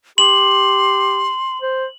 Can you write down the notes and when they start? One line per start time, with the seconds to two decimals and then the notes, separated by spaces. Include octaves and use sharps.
0.18 G4 C6 F#7
1.62 C5